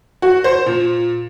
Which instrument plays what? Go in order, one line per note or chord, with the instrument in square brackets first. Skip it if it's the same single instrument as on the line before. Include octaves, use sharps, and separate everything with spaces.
[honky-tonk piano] F#4
C5
A#2